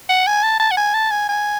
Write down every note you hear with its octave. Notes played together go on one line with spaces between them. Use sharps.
F#5
G#5
A5
A5
F#5
G#5
A5
G#5
G#5